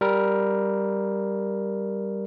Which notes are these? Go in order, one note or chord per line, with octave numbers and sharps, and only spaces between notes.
G3 A#4